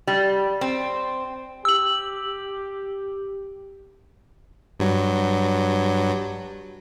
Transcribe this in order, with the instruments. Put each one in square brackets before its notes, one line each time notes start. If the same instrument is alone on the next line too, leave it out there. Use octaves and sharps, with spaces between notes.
[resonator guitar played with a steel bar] G3
C4
[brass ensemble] G4 [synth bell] E6 F#7
[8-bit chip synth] G2 F#3